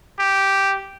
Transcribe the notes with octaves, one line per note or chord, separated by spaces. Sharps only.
G4